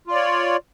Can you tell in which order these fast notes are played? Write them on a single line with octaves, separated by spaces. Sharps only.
F4 D5 C#5